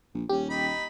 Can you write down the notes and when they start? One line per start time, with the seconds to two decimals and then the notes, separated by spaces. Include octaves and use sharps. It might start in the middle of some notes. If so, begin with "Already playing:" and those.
0.14 A#1
0.29 D#1 C#4 G4
0.50 D#4 B5